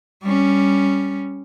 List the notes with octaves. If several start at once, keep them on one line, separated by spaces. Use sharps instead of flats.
G3 C#4